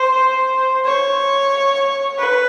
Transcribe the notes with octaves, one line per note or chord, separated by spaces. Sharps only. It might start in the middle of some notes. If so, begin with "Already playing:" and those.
Already playing: C5
C#5
B4